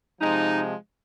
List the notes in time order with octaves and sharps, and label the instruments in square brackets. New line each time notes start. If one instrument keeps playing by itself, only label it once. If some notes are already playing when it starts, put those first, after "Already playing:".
[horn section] C3 F3 G#3 D#4